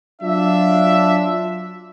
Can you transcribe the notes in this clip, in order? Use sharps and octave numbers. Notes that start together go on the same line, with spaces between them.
F#3 D4 F4 E5